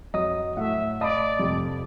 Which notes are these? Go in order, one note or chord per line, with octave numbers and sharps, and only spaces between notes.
F2 F#3 C#5 D#5 D#6
A2 A3 E5 F#5
D5 D#5 F5 A5 B5 D#6 D7
F2 C3 F3